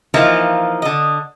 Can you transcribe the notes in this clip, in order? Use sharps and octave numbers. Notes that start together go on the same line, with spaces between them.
E3 F3 A#3 D#4 F4
D3 D#5